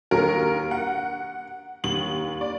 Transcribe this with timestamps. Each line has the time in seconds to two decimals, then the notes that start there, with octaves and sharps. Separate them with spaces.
0.11 D#2 A#4
0.71 F#5
1.84 D#2 F#7
2.41 D5